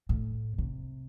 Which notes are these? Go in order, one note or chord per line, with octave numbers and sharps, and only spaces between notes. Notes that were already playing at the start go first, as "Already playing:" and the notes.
A2
C3